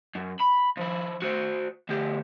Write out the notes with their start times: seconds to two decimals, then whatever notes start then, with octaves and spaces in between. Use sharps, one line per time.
0.15 F#2
0.40 B5
0.77 F3 E4
1.22 F#4 C5
1.89 D2 G4